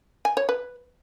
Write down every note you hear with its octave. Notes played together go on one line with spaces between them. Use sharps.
G#5
C#5
B4